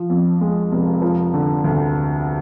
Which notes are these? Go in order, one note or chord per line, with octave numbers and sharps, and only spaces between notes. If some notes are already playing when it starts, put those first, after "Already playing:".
Already playing: F3
F2
G#3
F1
F3
D3
D2